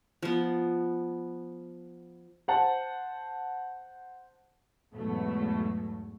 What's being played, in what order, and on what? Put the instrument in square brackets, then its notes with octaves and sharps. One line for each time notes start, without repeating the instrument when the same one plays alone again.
[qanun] F3 B3
[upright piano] C5 F#5 A5
[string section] E2 G#2 B2 F#3 A3